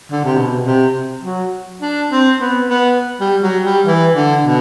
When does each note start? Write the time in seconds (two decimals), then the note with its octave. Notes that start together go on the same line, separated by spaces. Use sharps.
0.12 D3
0.24 C3
0.37 B2
0.66 C3
1.24 F#3
1.82 D4
2.11 C4
2.40 B3
2.70 B3
3.20 G3
3.43 F#3
3.64 G3
3.86 E3
4.16 D3
4.45 B2